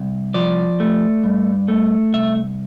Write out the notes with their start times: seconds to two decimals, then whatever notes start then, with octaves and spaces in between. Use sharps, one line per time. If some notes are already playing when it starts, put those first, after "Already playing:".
Already playing: C2
0.34 F3 D5
0.80 A3
1.24 G2
1.68 A3
2.13 C2 E5